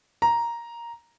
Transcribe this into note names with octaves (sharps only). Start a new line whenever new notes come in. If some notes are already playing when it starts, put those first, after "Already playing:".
A#5